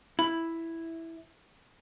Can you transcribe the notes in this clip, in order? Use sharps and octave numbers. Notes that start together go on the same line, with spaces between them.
E4 B5